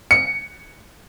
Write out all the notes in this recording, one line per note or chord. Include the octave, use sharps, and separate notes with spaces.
C#7